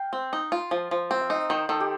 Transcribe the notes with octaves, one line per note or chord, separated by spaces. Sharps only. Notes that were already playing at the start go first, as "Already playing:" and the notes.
Already playing: F5 G5
C4
D#4
F4
F3
F3
C4
F5
D#4 D#5
D#3 C5
D#3 A4
G4